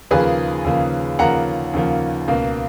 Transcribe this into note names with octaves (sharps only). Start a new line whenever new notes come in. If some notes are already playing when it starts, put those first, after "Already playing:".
D#2 C#3 F3 A#3 G#4 B4
D#2 C#3 F3 A#3
D#2 C#3 F3 A#3 F#5 A#5
D#2 C#3 F3 A#3
C#2 B2 A#3